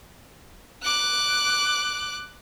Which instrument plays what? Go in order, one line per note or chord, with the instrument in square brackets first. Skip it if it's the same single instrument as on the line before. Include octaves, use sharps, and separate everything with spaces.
[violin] D6 F#6